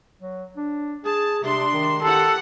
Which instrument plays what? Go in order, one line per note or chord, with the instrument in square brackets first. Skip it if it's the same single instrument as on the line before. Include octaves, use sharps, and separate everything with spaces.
[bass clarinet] F#3
D4
[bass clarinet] G#4 [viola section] A5
[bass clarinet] C3 [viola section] D4 C6
[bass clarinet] D#3
[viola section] G4 F#5 [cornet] A4